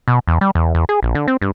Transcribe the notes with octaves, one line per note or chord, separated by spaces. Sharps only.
B2
E2
G3
E2
E2
G#4
A#1
D3
C4
G2